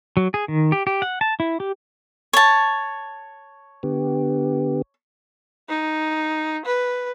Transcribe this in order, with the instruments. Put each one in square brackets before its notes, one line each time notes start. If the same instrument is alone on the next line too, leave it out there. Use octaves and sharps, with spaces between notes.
[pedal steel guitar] F#3
G#4
D#3
G4
G4
F#5
A5
E4
G4
[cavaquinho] C#5 A5
[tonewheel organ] D3 B3 G4
[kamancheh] D#4
B4